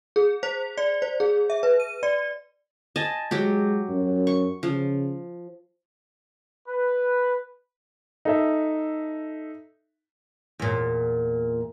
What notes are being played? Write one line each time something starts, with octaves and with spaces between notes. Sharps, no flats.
G#4
C5
D5
C5
G#4
E5
B4
D#7
D5
D#5 G#5 A5
F#3 G#3 G4
F#2
C#6
C#3 F3
B4
D#4 A4 E5
E2 A#2